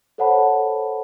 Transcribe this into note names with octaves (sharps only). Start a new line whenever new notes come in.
A4 C5 C#5 F#5 A5 B5